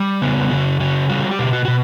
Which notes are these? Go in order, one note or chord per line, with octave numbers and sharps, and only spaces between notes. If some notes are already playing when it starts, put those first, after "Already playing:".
Already playing: G3
C#3 B3
C#3 F#4
C#3 F#4
G3 F#4
G4
B2
F#4
B2 F#4